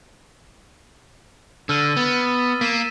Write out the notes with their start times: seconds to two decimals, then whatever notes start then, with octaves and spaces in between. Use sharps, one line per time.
1.69 D3 E6 F6 D#7
1.97 B3 A6
2.61 A#3 B6 D#7 E7